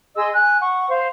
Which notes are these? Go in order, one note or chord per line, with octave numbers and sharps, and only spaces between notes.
G#4 D#5 C6 E6
G#5 F#6
F#5 C#6
C5 F5